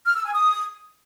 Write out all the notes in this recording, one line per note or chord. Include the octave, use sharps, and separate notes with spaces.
F6
E6
G#5
D#6